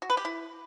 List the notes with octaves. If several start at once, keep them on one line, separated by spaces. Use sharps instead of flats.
F#4
B4
G4
E4